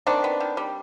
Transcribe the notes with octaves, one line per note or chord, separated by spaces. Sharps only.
D#3 C4 D4
B3
D#3
G3